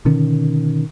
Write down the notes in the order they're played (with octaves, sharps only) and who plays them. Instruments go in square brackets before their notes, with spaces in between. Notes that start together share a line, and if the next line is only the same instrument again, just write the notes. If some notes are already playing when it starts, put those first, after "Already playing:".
[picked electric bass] B2 D3 D#3 C#4